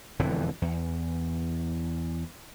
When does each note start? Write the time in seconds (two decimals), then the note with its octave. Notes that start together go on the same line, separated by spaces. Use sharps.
0.19 E1 F2 D3 E3
0.62 E2